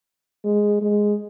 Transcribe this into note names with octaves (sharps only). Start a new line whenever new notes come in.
G#3
G#3